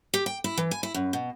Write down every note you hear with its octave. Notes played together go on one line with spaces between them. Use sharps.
G4
G5
E4
E3
G#5
E4
F#2
B2